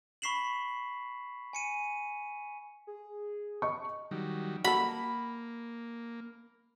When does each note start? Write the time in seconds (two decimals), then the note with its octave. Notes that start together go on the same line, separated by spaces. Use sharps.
0.22 B5 C#6 B6 C7 E7 F#7
1.53 G#5 C#7 D#7
2.87 G#4
3.62 D#5 C#6
4.11 D#3 F#3 G3
4.64 A#3 F#4 A4 B5